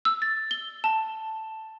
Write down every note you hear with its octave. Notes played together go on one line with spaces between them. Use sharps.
E6
A6
G7
A5